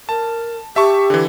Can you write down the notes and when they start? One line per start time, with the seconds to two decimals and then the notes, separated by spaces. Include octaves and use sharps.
0.09 A#4 A5
0.76 G4 E5 A5 C#6
1.10 D3 E3